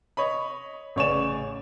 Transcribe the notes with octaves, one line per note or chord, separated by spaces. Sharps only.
C#5 D#5 B5
A1 C#3 C#5 D5 G#5 E7